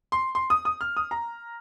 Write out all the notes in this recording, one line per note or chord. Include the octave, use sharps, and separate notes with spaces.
C6
C6
D#6
D#6
F6
D#6
A#5